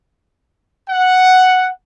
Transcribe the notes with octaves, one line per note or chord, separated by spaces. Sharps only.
F#5